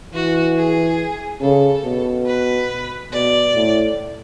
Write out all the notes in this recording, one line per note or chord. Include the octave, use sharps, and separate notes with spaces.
E3 F#4
G#4
C#3 A4
B2
B4
B2 D5
A2